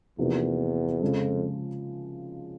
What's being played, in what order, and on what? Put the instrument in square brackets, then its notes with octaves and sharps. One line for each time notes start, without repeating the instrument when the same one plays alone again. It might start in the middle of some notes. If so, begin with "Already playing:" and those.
[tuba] E2 [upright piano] C3 F3 A#3 D#4 F#4
[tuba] F2 [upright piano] C#3 F3 G#3